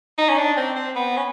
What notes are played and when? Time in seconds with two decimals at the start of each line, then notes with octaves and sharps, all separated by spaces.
0.18 D#4
0.29 C#4
0.38 D4
0.57 C4
0.76 C4
0.96 B3
1.17 C#4